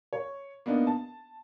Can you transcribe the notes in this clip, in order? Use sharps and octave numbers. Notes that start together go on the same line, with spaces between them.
C#5
A#3 B3 D4 D#4
A5